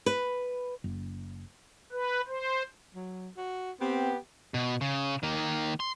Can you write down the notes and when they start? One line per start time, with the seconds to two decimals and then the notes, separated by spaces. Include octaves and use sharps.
0.06 B4
0.84 F#1
1.92 B4
2.28 C5
2.95 F#3
3.37 F#4
3.81 B3 C4 G4
4.54 B2
4.81 C#3
5.23 D#3 A#3
5.80 C6